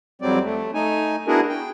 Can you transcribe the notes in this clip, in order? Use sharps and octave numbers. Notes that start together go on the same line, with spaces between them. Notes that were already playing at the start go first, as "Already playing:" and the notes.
F2 F#3 G3 C4 D5
A3
A3 D#4 G#5
B3 D4 E4 F#4 G#4 A#4
G5